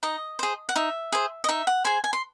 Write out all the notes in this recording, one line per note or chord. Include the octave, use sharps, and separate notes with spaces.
D#4 D#5
G#4 C5
F#5
D#4 E5
G#4 C5
D#5
D#4 E5
F#5
G#4 C5 G#5
G#5
C6